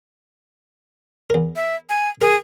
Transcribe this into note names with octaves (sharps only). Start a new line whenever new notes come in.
E2 A#4
E5
G#5
G#4 A#4